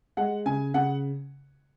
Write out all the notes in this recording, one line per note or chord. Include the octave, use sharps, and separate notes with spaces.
G#3 F#5
C#3 G#5
C#3 F#5